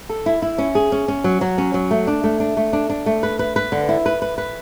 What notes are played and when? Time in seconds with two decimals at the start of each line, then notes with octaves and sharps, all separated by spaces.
0.09 A4
0.26 E4
0.42 E4
0.58 C#4
0.75 G#4
0.92 C#4
1.08 C#4
1.24 F#3
1.41 F#3
1.58 C#4
1.74 F#3
1.91 A3
2.07 D4
2.24 A3
2.40 D4
2.57 A3
2.73 D4
2.90 D4
3.06 A3
3.23 B4
3.39 B4
3.56 B4
3.72 D3
3.89 E4
4.06 B4
4.22 B4
4.38 B4